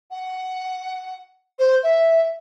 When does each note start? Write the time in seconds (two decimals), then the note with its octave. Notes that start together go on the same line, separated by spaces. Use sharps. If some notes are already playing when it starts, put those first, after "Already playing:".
0.11 F#5
1.59 C5
1.83 E5